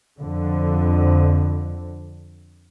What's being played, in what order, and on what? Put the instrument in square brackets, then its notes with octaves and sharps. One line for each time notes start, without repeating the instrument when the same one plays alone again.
[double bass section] F2 D3